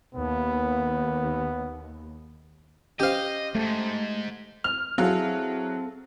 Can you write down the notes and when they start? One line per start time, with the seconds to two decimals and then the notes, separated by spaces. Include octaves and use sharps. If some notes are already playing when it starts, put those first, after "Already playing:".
0.15 D#2 B3
3.00 C#4 G4 C5 D#5 F5
3.55 F2 G#2 A3
4.64 F6
4.98 F#3 C4 E4 G#4 A4 F5